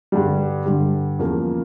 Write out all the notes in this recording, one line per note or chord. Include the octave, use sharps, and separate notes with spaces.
G2 D3 G3
G2 D3 G3
E2 C#3 F3 A#3